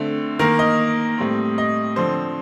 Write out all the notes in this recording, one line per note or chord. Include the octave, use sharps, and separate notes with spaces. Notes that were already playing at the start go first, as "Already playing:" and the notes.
Already playing: D3 A3 C4
D#3 A#3 A#4
D#5
A2 G3 C4
D#5
D3 F3 C4 C5